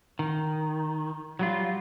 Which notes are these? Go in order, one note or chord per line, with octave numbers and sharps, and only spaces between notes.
D#3
F#3 G3 F4